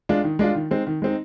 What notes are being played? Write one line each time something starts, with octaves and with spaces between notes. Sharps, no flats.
G#3 D4 F4
D#3
G#3 D4 F4
D#3
G#3 C4 D#4
D#3
G#3 C4 D#4